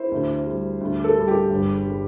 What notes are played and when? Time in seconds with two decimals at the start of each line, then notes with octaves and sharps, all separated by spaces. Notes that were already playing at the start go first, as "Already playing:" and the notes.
Already playing: E4 C5
0.12 D2
0.47 G3
0.81 D2
1.04 A4
1.16 G3
1.28 G4
1.50 G1
1.86 G3